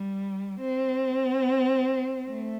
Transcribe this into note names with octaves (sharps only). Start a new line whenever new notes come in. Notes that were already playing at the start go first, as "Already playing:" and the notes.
Already playing: G3
C4
A3